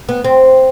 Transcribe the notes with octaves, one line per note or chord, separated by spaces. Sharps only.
B3
C4